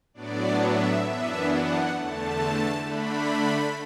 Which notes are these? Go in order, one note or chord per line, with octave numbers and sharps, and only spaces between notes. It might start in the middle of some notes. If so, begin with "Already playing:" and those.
A2 F#3 B3 D4 D5
E5
F#2 E3 B3 D4 E5
F#5
E2 D3 A3 A5
D3 A3 D4 B5